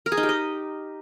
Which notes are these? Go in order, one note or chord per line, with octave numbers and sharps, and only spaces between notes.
A#4
G#4
D#4
G4
D#5